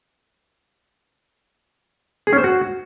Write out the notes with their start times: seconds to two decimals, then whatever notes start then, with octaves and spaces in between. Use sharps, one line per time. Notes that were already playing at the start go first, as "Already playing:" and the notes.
2.27 G#4
2.33 C#4
2.38 C5
2.44 F#4